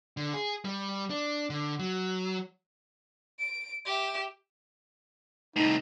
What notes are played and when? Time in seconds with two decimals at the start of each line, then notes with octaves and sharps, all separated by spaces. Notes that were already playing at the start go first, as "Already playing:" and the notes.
0.17 D3
0.34 G#4
0.65 G3
1.10 D4
1.50 D3
1.79 F#3
3.39 D7
3.86 G4 E5
5.56 C2 A2 D#4